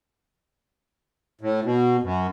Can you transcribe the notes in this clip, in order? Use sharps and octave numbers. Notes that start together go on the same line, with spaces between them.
A2
B2
F#2